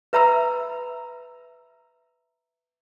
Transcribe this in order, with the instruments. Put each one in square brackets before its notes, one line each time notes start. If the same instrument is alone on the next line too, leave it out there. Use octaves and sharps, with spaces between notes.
[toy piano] B4 E5 A#5 B5 E6